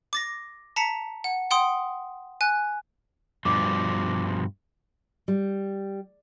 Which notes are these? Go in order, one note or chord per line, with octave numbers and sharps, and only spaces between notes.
D6 A6 A#6
A5 A#5 B6 C#7
F#5
F#5 G5 C6 D#6
G#5 F#6
G2 B2 F3 D6
G3